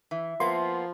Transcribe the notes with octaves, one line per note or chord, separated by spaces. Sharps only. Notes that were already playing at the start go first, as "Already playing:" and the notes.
E3 E5
F3 A#3 B3 C6